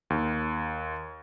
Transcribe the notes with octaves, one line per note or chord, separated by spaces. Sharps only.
D#2